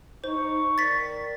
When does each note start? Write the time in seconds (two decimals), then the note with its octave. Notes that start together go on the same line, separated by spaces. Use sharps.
0.24 D#4 C5 C#6
0.78 D#3 A#4 D5 A6 B6